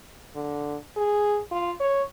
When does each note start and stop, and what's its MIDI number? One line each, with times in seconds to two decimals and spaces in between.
0.36 0.76 50
0.97 1.40 68
1.51 1.73 65
1.80 2.03 73